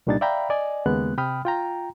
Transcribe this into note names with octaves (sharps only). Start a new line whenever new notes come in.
C2 A#2 G3 D4 D#4 A6
D5 E5 F5 G5 A#5 B5
D5 D#5 G#5
D#2 C#3 G#3 A#3 B3 F#6
C3 G5 B5 D#6 F6
F4 G5 A#5